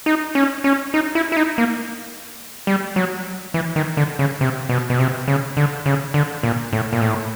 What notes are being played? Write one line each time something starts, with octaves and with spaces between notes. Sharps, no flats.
D#4
C#4
C#4
D#4
E4
E4
D#4
A#3
G3
F#3
E3
D#3
D3
C#3
C3
B2
B2
C3
C#3
D3
C#3
D3
A#2
A2
A#2
A2